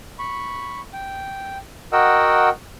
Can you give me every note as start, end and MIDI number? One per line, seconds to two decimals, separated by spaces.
0.19 0.80 83
0.19 0.80 85
0.93 1.58 79
1.93 2.49 66
1.93 2.49 70
1.93 2.49 75
1.93 2.49 78
1.93 2.49 79
1.93 2.49 88